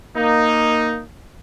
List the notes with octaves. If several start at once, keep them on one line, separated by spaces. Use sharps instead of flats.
A#3 D#4